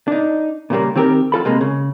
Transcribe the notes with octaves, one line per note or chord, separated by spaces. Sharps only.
D4 D#4
A#2 C#3 G3 A#3
D#3 C4 G4 G#4 A#4
F2 F4 A4 B5
C3 G#3 A#3
C#3